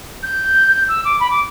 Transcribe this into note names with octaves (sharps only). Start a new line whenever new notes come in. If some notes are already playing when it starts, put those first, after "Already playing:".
G6
E6
D6
B5
D6